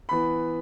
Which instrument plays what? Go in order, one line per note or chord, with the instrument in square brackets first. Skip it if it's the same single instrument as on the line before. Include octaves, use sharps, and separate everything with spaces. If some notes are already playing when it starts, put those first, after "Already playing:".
[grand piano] E3 B3 B5